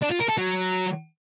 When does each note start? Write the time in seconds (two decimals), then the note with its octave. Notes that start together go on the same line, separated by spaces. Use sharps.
0.01 D4
0.10 F4
0.19 A#4
0.28 A4
0.37 F#3